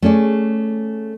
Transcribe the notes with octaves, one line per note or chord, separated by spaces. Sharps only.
A3 C#4 G#4 D5